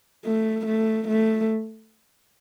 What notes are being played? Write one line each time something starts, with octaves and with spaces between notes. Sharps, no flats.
A3
A3
A3